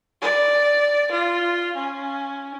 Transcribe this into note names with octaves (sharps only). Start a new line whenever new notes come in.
D5
F4
C#4